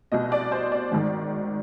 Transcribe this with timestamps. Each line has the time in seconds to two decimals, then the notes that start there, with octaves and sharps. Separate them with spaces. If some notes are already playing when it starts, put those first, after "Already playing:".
0.12 C2 B2 D#5
0.32 D5
0.52 C5
0.72 D5
0.91 G#1 G#2 D#3